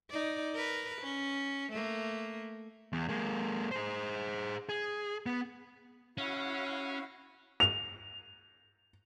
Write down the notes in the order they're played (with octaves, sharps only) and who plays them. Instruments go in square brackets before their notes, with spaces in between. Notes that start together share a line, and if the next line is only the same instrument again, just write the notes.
[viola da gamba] D#4 D5
A#4 B4
C#4
A3 A#3
[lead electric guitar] E2
G#3 A#3
G#4 C5
G#4
B3
[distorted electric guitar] C#4 [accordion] E4 F#4 F5
[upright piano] F7